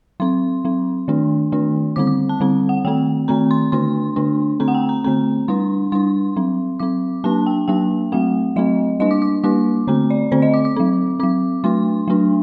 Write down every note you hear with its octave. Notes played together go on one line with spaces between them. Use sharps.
F#3 C4 C6
F#3 C4
D#3 A3 D4
D#3 A3 D4
D3 G3 C4 D6
D6
A5
D3 G3 C4
F#5
D#3 A3 C4 G5
D#3 A3 C4 A#5
C6
D3 A3 D4 C6
D3 A3 D4
D3 A3 C4 A#5
F#5
G5
A#5
D3 A3 C4 A#5
G3 D4 C6
G3 D4 C6
F#3 C4
F#3 C4 D6
F#3 A#3 D4 A5
G5
F#3 A#3 D4 G5
F#3 A3 C4 F#5
F#3 A3 C4 D#5
G3 A#3 D4 D#5
D6
D6
G3 A#3 D4 D6
D3 A3 C4 A#5
D5
D3 A3 C4 C5
D#5
D6
D6
F#3 C4
F#3 C4 D6
F#3 A3 D4 C6
F#3 A3 D4